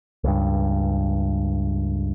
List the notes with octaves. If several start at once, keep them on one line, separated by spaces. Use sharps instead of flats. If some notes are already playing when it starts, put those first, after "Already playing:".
C#2 G2